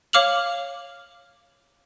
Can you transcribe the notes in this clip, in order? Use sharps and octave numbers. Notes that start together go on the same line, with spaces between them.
C#5 F5 D6 F6 F7 F#7